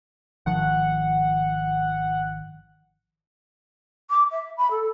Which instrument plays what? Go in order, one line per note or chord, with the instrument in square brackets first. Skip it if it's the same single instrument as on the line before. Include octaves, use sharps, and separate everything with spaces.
[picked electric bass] G#1 D#3 F3 [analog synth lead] F#5
[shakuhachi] D6
E5
B5
A4